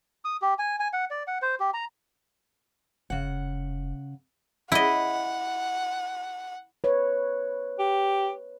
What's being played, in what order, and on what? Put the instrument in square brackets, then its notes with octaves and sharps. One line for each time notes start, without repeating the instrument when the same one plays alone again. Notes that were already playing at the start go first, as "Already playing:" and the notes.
[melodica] D#6
G4
G#5
G#5
F#5
D5
F#5
C5
G4
A#5
[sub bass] F1 [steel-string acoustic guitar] C#3 F#5
[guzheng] E4 D#5 [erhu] F#5
[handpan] B4 C#5
[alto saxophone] G4